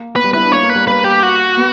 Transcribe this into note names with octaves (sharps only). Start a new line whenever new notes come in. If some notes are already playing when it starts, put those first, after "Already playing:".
Already playing: A#3
B3 B4
G3
E4 B4
D4
A#3 C#5
A#3
B4
G3
A#3 B4
G4
F#4
B3